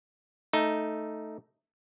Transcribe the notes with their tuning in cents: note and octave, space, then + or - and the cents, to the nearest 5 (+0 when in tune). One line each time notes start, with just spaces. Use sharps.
A3 +0 D#4 +0